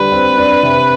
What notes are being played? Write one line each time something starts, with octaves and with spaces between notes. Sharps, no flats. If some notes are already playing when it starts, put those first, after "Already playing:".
Already playing: D3 G3 B4
C4
D4
C3